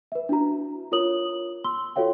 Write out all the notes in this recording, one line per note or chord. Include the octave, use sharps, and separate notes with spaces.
B4 E5
D4 E4 F#4 A#5
F4 A#4 C#5 D#6 F#7
C6 E6 G7
F4 F#4 A4 C#5 F5 G5